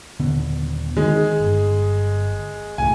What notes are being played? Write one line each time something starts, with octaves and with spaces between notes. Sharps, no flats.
D#1 D3 B3
D#3 G#3
G1
C2 A2 A3 G#5